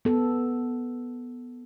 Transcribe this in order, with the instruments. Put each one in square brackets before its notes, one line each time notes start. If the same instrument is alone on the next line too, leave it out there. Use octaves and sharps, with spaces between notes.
[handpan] B3 A4